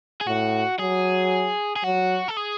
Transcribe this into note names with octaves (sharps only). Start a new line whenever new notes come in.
G#4
A2 F#4
F#3 G#4
G#4
F#3 F#4
A4
G#4